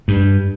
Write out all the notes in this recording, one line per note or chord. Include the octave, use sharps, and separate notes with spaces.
G2